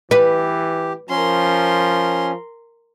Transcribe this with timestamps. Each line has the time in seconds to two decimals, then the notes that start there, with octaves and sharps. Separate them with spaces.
0.11 E3 G4 B4
1.09 F3 C#4 A#4 C6